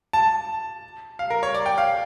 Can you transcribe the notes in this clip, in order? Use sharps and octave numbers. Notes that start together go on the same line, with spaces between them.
A5
F5
A#4
C#5
D5
G5
F5